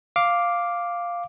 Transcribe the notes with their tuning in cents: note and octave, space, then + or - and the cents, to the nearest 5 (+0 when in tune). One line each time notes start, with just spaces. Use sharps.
F5 +0 D6 +0